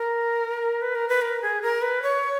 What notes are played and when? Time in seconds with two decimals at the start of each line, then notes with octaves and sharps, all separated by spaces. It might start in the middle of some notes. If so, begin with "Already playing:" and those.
Already playing: A#4
0.82 B4
0.95 A#4
1.09 B4
1.22 A#4
1.42 G#4
1.62 A#4
1.82 B4
2.02 C#5